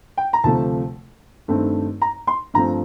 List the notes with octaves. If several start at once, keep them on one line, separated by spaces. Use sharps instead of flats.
G5
A#5
D2 C3 F3 A3 A5
G2 D#3 A3 C4
A#5
C6
G2 F3 A3 C4 A#5